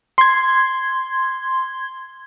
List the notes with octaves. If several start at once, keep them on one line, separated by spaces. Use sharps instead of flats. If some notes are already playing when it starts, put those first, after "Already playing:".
C6 G#6